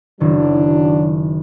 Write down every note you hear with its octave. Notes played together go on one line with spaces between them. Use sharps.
F#1 D#3 F#3 D4 E4